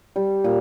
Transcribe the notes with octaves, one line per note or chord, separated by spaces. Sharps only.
G3
A#2